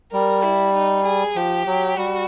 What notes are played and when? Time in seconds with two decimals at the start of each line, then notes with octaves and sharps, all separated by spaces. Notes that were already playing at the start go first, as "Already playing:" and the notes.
0.12 G3 A#4
0.44 E4
0.74 D#4
1.05 G#4
1.36 F3 G4
1.67 F#3
1.97 G3 F#4